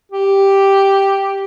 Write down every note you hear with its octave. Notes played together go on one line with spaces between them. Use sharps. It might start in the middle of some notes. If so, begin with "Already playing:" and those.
G4